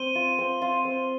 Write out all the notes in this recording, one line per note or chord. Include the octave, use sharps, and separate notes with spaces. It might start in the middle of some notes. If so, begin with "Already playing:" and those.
Already playing: C4 D#7 G7
F4
C4
F4
C4